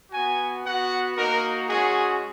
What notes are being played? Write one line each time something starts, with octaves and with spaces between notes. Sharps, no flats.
B3 F#4 G#5
B3 F#4 F#5
A#3 D#4 F#4 A#4
G#3 C#4 F#4 G#4